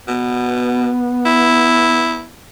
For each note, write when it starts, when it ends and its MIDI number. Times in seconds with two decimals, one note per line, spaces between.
0.08 0.90 47
0.08 2.28 59
1.26 2.26 64